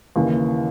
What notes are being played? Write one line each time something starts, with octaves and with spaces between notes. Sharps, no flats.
D#2 C#3 E3